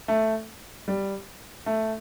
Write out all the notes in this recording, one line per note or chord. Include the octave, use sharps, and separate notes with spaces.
A3
G3
A3